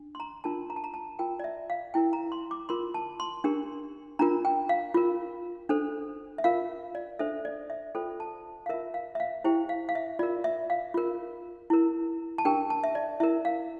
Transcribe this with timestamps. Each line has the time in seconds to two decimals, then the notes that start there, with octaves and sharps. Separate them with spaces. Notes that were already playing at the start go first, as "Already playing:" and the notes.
Already playing: D4
0.15 C6
0.20 A#5
0.44 D4 F4 A#4 A5
0.70 A#5
0.76 A5
0.84 A#5
0.94 A5
1.19 F4 A#4 G5
1.40 D5
1.44 E5
1.70 F5
1.94 E4 A#4 G5
2.13 A#5
2.32 C6
2.51 D6
2.69 F4 A#4 C6
2.94 A5
3.20 C6
3.44 D4 G4 A#4
4.19 D4 F4 A#4 A#5
4.45 G5
4.69 F5
4.94 F4 A#4
5.69 D4 A4 C5
6.38 E5
6.44 F4 A#4 F5
6.95 D5
7.19 D4 A4 C5 E5
7.45 D5
7.70 E5
7.95 F4 A4 C5 G5
8.20 A5
8.66 F5
8.69 F4 A#4 E5
8.94 F5
9.15 E5
9.20 F5
9.44 E4 G4 C5 G5
9.69 F5
9.89 F5
9.95 E5
10.19 F4 A#4 D5
10.44 E5
10.70 F5
10.94 F4 A#4
11.70 E4 A#4
12.38 A5
12.45 D4 G4 A#4 G5
12.70 A5
12.84 E5
12.95 D5
13.20 E4 A#4 E5
13.45 F5